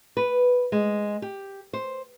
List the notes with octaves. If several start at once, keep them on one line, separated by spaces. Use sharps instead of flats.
B4
G#3
G4
C5